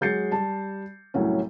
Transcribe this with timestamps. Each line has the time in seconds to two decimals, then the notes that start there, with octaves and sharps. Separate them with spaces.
0.01 F#3 G#3 G6 A6 C7 C#7
0.32 G3 A5
1.14 C2 A2 F#3 C#4